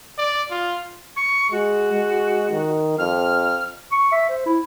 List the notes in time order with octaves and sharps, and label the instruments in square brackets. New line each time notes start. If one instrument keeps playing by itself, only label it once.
[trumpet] D5
F4
[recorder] C#6
[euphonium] G#3 [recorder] F#4
[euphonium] G#3
D#3
[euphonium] F2 [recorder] F6
[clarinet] C#6
E5
C5
E4